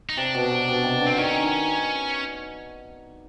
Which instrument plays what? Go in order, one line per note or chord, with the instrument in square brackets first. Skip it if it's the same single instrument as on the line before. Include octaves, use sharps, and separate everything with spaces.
[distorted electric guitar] D#4
[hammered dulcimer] C3 [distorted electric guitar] D4
[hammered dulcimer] B2
C3
B2
C3
D3
[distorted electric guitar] C4
[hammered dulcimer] D#3 [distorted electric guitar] C#4
[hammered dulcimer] D#3